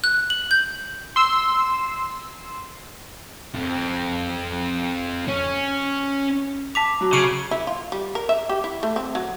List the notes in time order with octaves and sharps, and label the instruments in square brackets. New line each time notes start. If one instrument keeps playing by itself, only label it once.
[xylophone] F#6
F#7
G6
[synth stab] C6 E6
[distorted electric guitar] F2
C#4
[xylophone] A5 B6 F7 [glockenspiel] D6
[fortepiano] F#3
[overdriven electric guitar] C#3 [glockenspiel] C#6 D#7
[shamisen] E4
F4
G3
A#4
E5
G4
E4
A3
C4
F#3